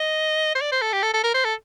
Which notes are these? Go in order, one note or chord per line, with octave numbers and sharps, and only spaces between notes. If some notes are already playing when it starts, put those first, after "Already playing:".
Already playing: D#5
C5
D5
C5
A4
G4
A4
A4
A#4
C5
A4